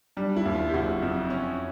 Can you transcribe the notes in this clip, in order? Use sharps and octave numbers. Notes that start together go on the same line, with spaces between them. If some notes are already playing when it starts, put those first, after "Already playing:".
G3 D4
E4
D#2
F4
G4
F#1 F#4
F2
C#4